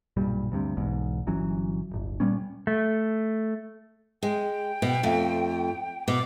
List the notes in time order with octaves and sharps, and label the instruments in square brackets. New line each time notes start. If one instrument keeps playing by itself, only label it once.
[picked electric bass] B1 G2 A#2 G3
D2 G2 C3
B1 E2 G#2
G1 E3 F#3 C#4
D1 G1
A#2 G3 B3 C#4
[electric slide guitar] A3
[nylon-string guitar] G#3 [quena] G5
[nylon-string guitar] B2
F2 A3
[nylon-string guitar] B2 [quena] D6